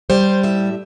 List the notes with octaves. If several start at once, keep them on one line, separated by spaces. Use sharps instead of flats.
G3 C5
A2 E5